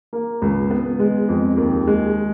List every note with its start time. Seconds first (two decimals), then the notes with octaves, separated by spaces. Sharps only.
0.13 A#3
0.42 C#2
0.71 B3
0.99 G#3
1.29 F2
1.57 D#2
1.87 G#3